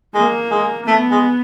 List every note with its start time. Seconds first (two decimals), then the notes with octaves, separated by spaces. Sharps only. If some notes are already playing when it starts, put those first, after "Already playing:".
0.14 G#3 A#3
0.51 G#3
0.87 A3 B3
1.11 G#3